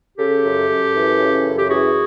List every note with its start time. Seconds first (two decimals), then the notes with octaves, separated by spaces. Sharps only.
0.19 C#3 G4 A4
0.45 F#2
0.69 F#2
0.95 E3
1.20 C#3
1.45 F#2
1.59 G4
1.69 E3 F#4 G#4